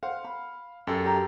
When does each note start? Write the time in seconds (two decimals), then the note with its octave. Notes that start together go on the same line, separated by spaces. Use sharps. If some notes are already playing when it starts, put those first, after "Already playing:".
0.03 C5 F5 F#5
0.24 B5
0.87 F#2 G4 A4
1.05 G4 E5 A#5